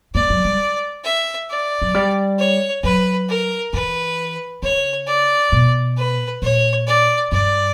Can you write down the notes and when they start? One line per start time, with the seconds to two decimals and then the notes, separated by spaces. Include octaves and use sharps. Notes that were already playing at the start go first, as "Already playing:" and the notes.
0.15 A#3 D5
0.30 F#3
0.45 G3
1.04 E5
1.49 D5
1.82 F#3
1.94 G3
2.39 C#5
2.83 F#3 B4
3.28 A#4
3.73 E3 B4
4.63 C#3 C#5
5.07 D5
5.52 B2
5.97 B4
6.42 A#2 C#5
6.87 D5
7.32 G2 D5